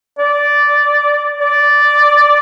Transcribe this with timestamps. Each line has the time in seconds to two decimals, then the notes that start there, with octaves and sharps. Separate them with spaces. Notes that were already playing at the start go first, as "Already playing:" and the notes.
0.19 D5
1.41 D5